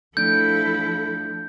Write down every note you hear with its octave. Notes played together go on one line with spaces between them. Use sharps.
F3 A3 D4 E4 A4 G6 D7